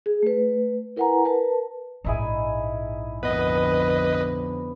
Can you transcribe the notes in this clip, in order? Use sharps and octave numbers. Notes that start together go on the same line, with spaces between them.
G#4
A3 B4
E4 A#4 B4 F#5 G#5 A#5
A#4 B4 A5
A#1 G#2 D#4 E4 G#4
F2 D3 B3 B4 D#5